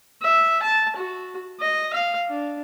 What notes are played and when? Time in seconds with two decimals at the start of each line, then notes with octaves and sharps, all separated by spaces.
0.22 E5
0.63 A5
0.97 F#4
1.61 D#5
1.94 F5
2.29 D4